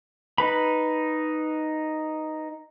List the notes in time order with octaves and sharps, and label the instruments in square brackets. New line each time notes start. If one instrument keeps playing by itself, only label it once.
[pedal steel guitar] D#4 B4 B5